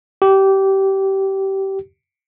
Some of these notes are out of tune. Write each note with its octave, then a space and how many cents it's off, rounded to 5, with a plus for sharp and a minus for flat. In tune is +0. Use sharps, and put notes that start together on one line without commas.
G4 -20